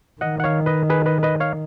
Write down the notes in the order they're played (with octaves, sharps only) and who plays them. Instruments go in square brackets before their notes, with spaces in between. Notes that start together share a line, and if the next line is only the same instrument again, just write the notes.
[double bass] D#3 [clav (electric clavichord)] D#5 F#5
[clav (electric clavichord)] F#5
C#5 F5
B4 D#5
G#4 B4
B4 D#5
B4 D#5
C#5 F5